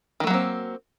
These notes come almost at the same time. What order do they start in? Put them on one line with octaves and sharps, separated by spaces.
D#3 A3 F#3 A#3 C4